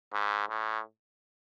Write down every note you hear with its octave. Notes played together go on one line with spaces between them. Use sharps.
G#2
A2